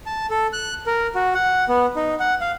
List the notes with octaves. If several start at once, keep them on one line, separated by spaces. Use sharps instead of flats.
A5
A4
F#6
A#4
F#4
F#5
B3
D#4
F#5
F5